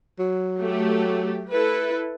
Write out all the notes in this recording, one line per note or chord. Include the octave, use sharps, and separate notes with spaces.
F#3
A3 G4
E4 A4 B4